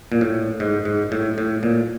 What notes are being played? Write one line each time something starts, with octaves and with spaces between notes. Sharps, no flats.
A#2
A2
G#2
G#2
A2
A2
A#2